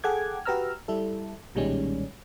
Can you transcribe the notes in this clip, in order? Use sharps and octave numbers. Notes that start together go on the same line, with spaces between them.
G#4 A4 F#5 G5 D6 G#6
F#4 G4 B4 A#5 E6 F6
G3 E4 A4
B1 A#2 D#3 G3 G#3 C#4